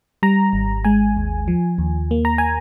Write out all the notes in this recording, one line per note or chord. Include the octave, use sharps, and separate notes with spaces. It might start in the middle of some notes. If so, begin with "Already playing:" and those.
G3 A#5
G#1
G#3 G#5
D#2
F3
D#2
A#3
A#5
G#5